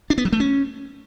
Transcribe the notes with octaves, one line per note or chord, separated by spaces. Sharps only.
D4
B3
F#3
A3
C#4